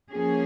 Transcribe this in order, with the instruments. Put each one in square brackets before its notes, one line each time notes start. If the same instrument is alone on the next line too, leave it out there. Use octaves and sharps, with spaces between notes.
[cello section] F3 A#3 C#4 G#4